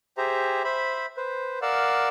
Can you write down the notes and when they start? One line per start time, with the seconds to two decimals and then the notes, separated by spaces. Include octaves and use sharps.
0.18 G4 G#4 C5 E5 A#5
0.64 C5 E5 B5
1.17 B4 C5
1.62 A#4 D5 F5 F#5 E6